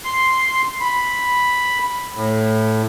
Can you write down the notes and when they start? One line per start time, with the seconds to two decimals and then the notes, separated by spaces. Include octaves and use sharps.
0.05 C6
0.80 B5
2.15 A2